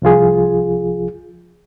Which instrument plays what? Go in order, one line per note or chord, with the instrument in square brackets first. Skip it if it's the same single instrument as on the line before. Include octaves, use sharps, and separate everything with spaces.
[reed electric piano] C2 F3 F4 G#4